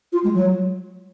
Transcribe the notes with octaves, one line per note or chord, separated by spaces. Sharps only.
F4
G#3
F#3